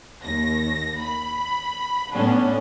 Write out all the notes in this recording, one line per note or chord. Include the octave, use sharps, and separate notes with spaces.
D#2 A#6
B5
A2 B3 C#4 D4